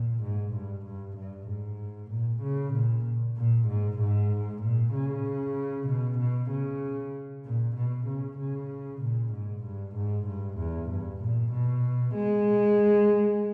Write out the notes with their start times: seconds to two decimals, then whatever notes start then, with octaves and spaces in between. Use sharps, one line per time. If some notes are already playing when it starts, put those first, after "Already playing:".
Already playing: A#2
0.23 G#2
0.54 G2
0.86 G2
1.17 G2
1.48 G#2
2.11 A#2
2.42 C#3
2.74 A#2
3.37 A#2
3.68 G#2
4.00 G#2
4.62 A#2
4.93 C#3
5.88 B2
6.19 B2
6.51 C#3
7.45 A#2
7.76 B2
8.07 C#3
8.38 C#3
9.01 A#2
9.33 G#2
9.64 G2
9.96 G#2
10.27 G2
10.58 E2
10.90 G2
11.21 A#2
11.53 B2
12.15 G#3